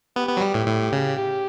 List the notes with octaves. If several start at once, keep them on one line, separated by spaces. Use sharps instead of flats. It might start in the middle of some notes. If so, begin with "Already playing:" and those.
B3 G4
B3
F#3
G3
A2
A2
C#3
G4